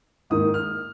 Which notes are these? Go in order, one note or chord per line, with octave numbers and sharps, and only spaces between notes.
G#2 D#3 A#3 D#6
F6